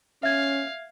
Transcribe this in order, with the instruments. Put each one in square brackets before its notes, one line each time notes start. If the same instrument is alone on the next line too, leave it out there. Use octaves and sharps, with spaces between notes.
[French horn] C#4 [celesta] E5 G#6 [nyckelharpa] F5